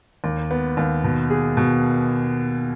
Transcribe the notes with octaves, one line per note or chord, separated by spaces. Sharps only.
D#2
B3
D#2
B2
G#4
B2